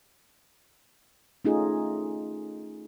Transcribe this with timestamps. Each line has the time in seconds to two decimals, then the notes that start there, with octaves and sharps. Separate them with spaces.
1.45 A3 C#4 D#4 F4 G#4